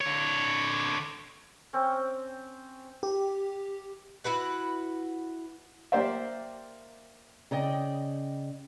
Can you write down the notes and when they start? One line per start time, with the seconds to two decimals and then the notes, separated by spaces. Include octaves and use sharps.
0.01 D3 C#5
1.73 C4 C#4
3.03 G4
4.24 E4 F#4 B4 F#5
5.92 A#3 G4 C5 D5 E5
7.51 C#3 D5 D#5 G5